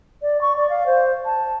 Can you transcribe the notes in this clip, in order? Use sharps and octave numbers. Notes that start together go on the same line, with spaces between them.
D5
C#6
D5
F5
C5
A5